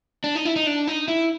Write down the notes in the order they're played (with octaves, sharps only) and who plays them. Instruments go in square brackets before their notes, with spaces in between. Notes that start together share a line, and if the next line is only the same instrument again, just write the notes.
[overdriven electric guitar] D4
D#4
E4
D#4
D4
D#4
E4